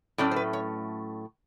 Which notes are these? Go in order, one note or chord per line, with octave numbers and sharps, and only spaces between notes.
A2 F#3 A3 C#4 D5
C5
B4
C#5